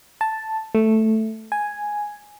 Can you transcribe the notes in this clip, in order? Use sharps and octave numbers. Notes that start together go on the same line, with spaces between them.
A5
A3
G#5